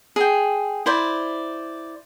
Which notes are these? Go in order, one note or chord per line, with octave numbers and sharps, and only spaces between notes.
G#4 G5
E4 C5 D5